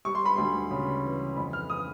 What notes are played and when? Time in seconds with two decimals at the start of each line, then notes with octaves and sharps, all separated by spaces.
0.05 G3 C#6
0.15 C6
0.25 B5
0.36 D2 C6
0.71 C#3
1.04 E3
1.36 F2 B5
1.53 F6
1.70 D#6